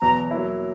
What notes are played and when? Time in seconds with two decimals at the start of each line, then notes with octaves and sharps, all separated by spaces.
0.01 E2 B2 F#3 A#5
0.31 F#3 A#3 E4